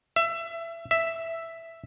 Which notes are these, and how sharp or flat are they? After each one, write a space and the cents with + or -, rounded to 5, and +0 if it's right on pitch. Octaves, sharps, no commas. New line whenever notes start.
E5 +25
E5 +5